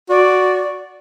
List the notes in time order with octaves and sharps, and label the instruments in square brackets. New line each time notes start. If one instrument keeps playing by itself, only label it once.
[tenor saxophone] F#4 [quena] D5